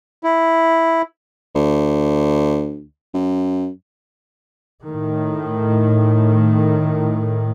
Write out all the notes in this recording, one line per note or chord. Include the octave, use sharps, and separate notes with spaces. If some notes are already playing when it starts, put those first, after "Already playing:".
E4
D2
F#2
A2 D#3